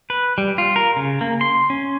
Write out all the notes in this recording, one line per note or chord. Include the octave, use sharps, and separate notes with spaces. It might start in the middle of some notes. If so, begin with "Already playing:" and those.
B4
G3
F4
A#4
C#3
A#3
C6
C#4